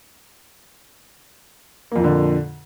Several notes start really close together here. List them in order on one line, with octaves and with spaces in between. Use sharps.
A#3 F2 A#2 D3